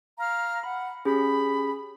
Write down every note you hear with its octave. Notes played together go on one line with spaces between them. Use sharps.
F5 A#5 F6
F#5 B5
C#4 G4 G#4 B5